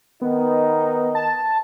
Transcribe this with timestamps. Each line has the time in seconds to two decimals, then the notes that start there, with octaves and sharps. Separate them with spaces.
0.21 D#3 B3 D#4
1.15 A5